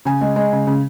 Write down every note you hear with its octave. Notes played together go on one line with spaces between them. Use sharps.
C#3 G#5
G#3
G#3
C#3
C#3